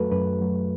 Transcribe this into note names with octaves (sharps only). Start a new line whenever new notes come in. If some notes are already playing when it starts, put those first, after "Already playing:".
Already playing: F#2 F#3 A3 F#4 A4 B4
F#2 B4
F#3 A3